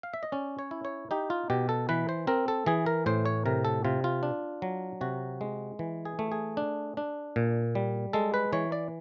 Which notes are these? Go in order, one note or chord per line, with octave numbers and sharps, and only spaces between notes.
F5
E5
D#5
C#4 D5
C#5
E4
C#5
D#4 G4
F4
B2 G4
A4
E3 B4
C5
C4 A#4
A4
E3 G#4
A#4
A2 C5
C#5
C3 A#4
A4
C3 F4
F4
D4
F#3
C3 F#4
G#3
E3
G#4
A3
G#4
D4
D4
A#2
G3
G#3 A4
B4
E3 C#5
D5